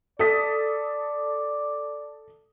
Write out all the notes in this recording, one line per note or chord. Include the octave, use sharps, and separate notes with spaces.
A4 D5 D#6 B6